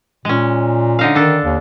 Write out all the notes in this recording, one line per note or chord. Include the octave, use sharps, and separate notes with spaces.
A#2 G#3 C#4
D3 D#4 F5
D#3 D4 A4
D#2